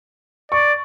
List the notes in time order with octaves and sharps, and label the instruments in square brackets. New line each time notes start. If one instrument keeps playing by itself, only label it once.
[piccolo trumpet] D5 [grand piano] C#6